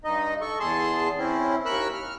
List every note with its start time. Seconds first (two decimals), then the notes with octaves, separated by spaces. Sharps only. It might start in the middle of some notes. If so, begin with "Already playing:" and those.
0.04 G2 D#4 D#5
0.41 A4 C#6
0.60 E2 G#4 A5 C6
1.18 C4 C#4 E4
1.66 D#2 A#4 B5 C#6 E6 F#6
1.94 F6